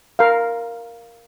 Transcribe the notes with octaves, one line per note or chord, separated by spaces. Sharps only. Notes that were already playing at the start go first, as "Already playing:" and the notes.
A#4 F5